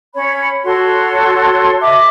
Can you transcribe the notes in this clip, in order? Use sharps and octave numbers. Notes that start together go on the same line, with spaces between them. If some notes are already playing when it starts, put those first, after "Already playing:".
C#4 C#5 B5
F#4 A4 C#5 C6
D#5 E5 D6